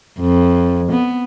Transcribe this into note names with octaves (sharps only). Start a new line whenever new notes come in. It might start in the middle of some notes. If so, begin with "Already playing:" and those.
F2
B3